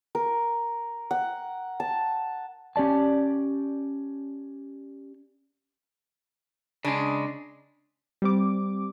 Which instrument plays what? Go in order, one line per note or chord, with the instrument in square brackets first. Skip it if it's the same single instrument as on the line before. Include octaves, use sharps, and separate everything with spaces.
[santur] A#4
F#5
A5
[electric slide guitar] C#4 G4 D5 A5
[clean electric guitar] C#3 G#3 [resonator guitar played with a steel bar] D4
[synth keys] G3 C4 D6